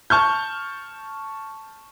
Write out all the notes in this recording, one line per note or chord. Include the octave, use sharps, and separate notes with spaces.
A5 C#6 F6 G6